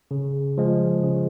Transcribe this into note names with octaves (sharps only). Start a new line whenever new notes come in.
C#3
F3 G#3
C#3